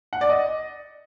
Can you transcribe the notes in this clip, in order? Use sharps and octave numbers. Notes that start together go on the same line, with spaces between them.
F#5
D5
D#5